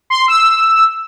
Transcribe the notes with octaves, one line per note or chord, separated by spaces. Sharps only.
C6
E6